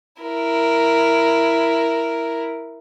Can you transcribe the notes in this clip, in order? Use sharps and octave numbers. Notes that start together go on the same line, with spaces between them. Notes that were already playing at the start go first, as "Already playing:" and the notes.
E4 A#4